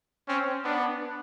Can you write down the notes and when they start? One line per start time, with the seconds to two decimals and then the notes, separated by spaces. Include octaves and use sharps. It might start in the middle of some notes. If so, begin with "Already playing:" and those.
0.28 C4 C#4
0.64 B3 D4